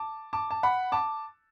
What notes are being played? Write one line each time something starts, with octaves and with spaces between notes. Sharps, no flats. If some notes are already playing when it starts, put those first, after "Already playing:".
Already playing: A5 D6
A5 D6
A5
F#5 B5
A5 D6